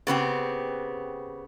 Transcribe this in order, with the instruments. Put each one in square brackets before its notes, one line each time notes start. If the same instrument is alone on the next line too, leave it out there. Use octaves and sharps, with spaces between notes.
[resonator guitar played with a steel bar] C#3 B3 C4 G4